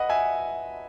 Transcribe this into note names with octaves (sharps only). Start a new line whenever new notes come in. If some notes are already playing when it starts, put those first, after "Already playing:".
Already playing: B4 D#5 F#5
E5 G#5